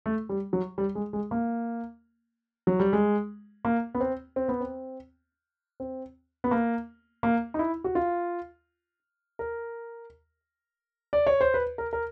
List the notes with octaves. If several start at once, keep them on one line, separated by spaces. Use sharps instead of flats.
A3
G3
F#3
G3
G#3
G#3
A#3
F#3
G3
G#3
A#3
B3
C4
C4
B3
C4
C4
B3
A#3
A#3
D#4
E4
F#4
F4
A#4
D5
C#5
C5
B4
A#4
A#4